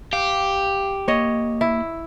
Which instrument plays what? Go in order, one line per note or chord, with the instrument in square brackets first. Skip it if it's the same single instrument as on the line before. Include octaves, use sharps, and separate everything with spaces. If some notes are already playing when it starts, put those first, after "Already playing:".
[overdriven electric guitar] G4 [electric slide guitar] F5
[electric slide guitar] A#3 [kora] C#5 D#5
[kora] E4